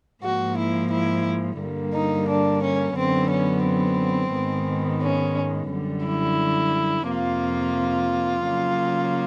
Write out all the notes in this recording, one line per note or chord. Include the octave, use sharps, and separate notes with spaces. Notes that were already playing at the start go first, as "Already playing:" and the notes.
G#2 F3 A#3 F#4
E4
E4
G2 D3 G3 A#3
D#4
D4
C#4
F#2 D3 F#3 B3 C4
C#4
C4
G#2 D#3 G#3 B3
C#4
F#2 D3 G3
E4
F2 C3 F3 A#3 F4
C#3 F#3 A#3